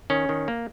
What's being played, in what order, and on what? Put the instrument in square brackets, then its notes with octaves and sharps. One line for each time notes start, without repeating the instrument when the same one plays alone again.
[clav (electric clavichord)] D#3 C#4
D#3
A#3